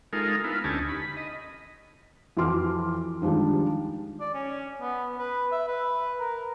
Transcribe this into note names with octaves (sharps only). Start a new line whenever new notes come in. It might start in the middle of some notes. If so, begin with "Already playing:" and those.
G#3 D#4 F4 A4 A#4
B3 E4 F4
D2 C#4 D#4 G4 G#5 A5
B5
D#5
F2 E3 F#4 C6 D6 F6
D#3 F3 G3 G#3 D4
D5
C#4
B3
B4
E5
B4
A#4